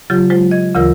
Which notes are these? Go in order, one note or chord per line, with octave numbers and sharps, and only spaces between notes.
C#3 F#3 F4 G4
F#3 G#3 F4 C5
D#5 G#6
D2 C#3 E3 F4 A#4 E6